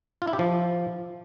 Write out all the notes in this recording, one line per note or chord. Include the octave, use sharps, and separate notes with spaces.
F4
E4
G4
F3